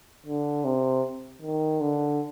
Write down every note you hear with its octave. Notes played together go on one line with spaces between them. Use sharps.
D3
C3
D#3
D3